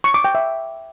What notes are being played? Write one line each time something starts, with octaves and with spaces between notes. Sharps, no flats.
C#6
D6
G5
E5